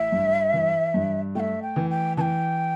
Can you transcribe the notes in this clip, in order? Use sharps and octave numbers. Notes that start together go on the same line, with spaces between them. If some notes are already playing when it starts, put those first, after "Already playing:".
Already playing: A1 E5
G2
E3
G2
A3 E5 G5
G5
E3
G5
E3 G5 A5